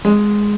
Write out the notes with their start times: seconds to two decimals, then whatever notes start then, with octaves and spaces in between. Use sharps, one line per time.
0.05 G#3